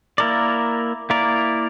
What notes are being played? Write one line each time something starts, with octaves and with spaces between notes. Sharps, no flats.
A#3 E4 A#4 D5
A#3 E4 A#4 D5